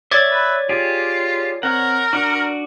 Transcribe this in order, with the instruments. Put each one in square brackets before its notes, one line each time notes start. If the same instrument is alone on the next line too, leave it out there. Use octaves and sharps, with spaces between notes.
[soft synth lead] C#5 [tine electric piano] D5 G#6 A6 [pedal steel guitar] E5
[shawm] B4
[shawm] F4 [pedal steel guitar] G4 G#4
[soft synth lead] C4 [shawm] A#4 [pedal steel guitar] C#5 F#5
[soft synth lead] D4 [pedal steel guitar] F#4 D5 F#5